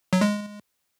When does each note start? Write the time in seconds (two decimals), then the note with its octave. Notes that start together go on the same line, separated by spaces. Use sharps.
0.13 F#3
0.21 G#3